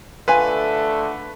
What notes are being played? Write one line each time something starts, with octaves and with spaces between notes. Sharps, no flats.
D3 A3 F4 B4 F5 G#5